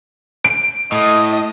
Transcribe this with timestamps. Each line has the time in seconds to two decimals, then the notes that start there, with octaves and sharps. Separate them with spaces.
0.44 D7
0.92 A2 D#5